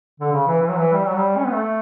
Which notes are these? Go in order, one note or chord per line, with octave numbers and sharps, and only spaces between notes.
D3
C#3
E3
E3
F#3
E3
G3
F#3
G3
C#4
B3
A3